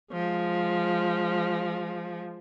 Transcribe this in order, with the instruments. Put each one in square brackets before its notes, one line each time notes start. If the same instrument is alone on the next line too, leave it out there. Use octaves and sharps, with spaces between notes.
[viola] F3 G#3